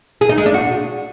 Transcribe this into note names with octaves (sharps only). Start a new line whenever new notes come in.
G#4
D#4
G#3
D4
F#4